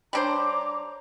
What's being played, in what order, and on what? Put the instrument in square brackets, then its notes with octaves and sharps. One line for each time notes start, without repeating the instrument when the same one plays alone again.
[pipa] G3 D4 C5 [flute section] C#5 A#5 D6